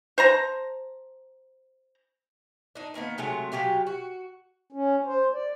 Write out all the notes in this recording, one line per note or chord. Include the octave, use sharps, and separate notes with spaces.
C5 A5 A#5
D4 D#4
D#3 A#3 B3 D#4
C3 F#3 G#3 A3
C3 F#3 G4 F5
F#4
C#4
C5
D5